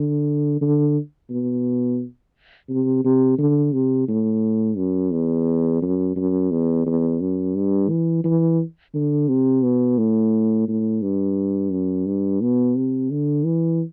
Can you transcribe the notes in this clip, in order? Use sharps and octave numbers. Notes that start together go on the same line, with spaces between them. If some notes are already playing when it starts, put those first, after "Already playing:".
Already playing: D3
D3
B2
C3
C3
D3
C3
A2
F#2
E2
F#2
F#2
E2
E2
F#2
G2
E3
E3
D3
C3
B2
A2
A2
G2
F#2
G2
B2
C3
D3
E3